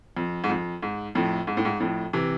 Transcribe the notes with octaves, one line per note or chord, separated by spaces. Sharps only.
F2
G#2
F2
G#2
F2 A2
G#2
A2
G#2
F2 A2
C3 E3